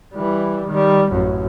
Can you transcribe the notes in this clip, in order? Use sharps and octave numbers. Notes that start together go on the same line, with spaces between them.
E3 G3
D#3 G3
A1 F#2